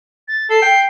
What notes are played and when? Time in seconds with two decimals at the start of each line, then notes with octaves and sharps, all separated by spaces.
0.28 A6
0.50 A4 C7
0.62 G5